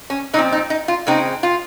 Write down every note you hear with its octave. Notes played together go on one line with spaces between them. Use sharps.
C#4
A#2 F3 C4 D#4
D#4
D#4
F4
C#3 G#3 C4 D#4
F4